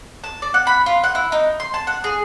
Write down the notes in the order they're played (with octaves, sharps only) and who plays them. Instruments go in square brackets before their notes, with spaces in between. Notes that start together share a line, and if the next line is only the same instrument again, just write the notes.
[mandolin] A5
D5
F#5
B5
F4
F#5
E4
D#4
C6
A5
F#5
G#4